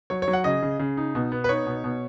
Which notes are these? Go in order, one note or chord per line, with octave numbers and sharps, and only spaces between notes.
F#3 C#5
C#5
F#3
F#5
C#3 D#5
C#3
C#3
D#4
B2
B3
B4
D#4 C#5
B2
B2